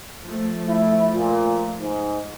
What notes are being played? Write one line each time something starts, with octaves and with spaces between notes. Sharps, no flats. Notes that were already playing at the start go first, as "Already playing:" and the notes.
F3 A3
E4
A#2
G#2